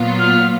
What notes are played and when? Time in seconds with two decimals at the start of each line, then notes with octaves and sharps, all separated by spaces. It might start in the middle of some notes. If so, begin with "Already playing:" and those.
Already playing: A#2 F#3 B3 F4
0.19 F6